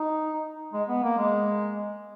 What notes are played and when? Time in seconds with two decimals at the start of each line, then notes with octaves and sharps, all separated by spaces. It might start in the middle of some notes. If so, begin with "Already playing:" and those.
Already playing: D#4
0.73 G#3
0.88 B3
1.03 A#3
1.18 G#3